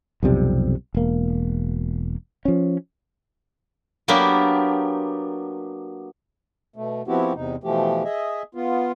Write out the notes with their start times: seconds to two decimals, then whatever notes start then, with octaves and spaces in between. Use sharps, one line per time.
0.23 B1 F2 C3 G3
0.94 E1 A#3
2.45 F3 C#4
4.08 F#3 A#3 B3 D4 G4
6.76 B2 A3
7.08 F3 B3 C4 E4 F#4 G4
7.35 E2 C3 D#4
7.64 B2 E3 F3 A3 G4
8.04 G#4 D#5 E5
8.55 B3 F4